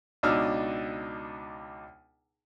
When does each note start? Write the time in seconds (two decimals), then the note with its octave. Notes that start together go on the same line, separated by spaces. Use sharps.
0.23 C#2 B2 D4 D#4 E6 F6